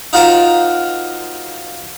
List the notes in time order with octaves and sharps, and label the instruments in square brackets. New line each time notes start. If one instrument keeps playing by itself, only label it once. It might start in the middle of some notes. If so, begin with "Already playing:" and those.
[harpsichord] D#4 F4 F#4 A#4 C5